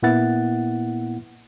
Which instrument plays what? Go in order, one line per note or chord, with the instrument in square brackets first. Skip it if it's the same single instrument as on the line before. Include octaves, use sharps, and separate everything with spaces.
[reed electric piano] A#2 A#3 B3 E4 F#5 A6